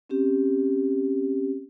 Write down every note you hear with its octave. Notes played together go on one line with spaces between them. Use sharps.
C4 C#4 G4